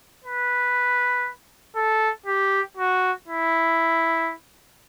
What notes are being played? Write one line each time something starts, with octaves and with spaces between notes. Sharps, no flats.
B4
A4
G4
F#4
E4